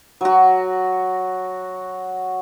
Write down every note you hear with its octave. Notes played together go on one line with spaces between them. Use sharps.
F#3 F#4